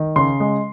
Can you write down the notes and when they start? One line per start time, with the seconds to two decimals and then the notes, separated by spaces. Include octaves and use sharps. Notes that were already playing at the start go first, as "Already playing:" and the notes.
Already playing: D#3
0.16 C#3 C6
0.40 G#3